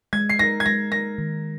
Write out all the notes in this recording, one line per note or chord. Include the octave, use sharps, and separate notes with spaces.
G#3 G#6
C7
D#4 A#4 A#6
G#6
G#3 A#6
D#4 A#4 A#6
D#3